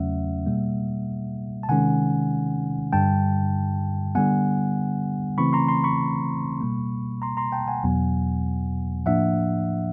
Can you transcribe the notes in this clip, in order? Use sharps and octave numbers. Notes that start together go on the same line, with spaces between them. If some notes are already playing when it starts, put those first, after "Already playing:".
Already playing: E2 C#3 F#3 A3 C#4 E5 F#5
B2 G3 A#3
A5
C3 D#3 G#3 C#4 F#5 G#5
G2 D3 G3 G5 A5
D3 G3 B3 F#5 G#5
C#3 E3 A3 C4 B5 C#6
A#5 C6
A#5 C6
B5 C#6
B2 G3 A#3
A#5 C6
A#5 C6
G5 A5
F#5 G#5
E2 B2 F#3 B3
A2 F3 A#3 D4 E5 F#5